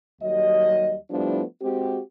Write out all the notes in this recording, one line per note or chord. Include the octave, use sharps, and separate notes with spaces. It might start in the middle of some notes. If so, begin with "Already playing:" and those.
D#2 F#3 G3 D#5
F3 G3 A3 B3 D4 E4
G#3 C4 F#4 G4